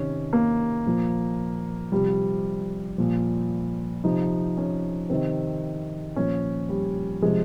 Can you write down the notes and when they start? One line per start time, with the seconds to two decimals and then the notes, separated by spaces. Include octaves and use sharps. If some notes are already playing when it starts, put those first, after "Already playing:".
Already playing: C3 D#3 C#4
0.33 A#3
0.86 A#2 F3
1.92 C3 F3 G3
2.98 A#2 F3
4.04 C3 F3 D#4
4.58 C#4
5.10 C3 D#3 C4
6.16 A#2 F3 C#4
6.69 G3
7.22 C3 F3 G#3